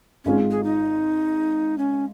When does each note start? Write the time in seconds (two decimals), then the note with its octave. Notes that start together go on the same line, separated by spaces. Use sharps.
0.25 G#1 G#2 G#3 C#4 F4
0.51 G#4
0.64 D#4
1.78 C#4